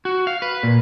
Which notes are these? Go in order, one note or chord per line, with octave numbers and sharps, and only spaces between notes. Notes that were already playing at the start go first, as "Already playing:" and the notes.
F#4
F5
B4
A#2